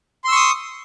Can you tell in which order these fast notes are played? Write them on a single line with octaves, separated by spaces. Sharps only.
C6 E6 C#6 D#6